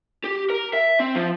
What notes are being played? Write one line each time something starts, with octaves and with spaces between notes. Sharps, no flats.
G4
A#4
E5
C4
F3